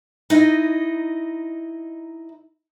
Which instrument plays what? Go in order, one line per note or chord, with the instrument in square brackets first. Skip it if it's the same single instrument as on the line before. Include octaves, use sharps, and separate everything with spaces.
[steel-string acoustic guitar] D#4 E4 D#5